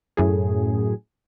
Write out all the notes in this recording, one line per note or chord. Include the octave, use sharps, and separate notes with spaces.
F#2 A2 G#4